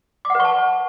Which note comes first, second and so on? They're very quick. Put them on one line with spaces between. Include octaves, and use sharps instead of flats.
D6 F#5 B4 C#6 A5